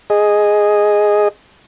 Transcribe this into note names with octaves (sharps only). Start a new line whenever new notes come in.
G#4 D#5